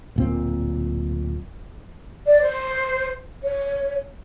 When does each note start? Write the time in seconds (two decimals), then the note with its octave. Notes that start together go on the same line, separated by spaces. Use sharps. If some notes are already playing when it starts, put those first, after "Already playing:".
0.16 D1 A#2 C4
2.26 D5
2.42 C5
3.44 C#5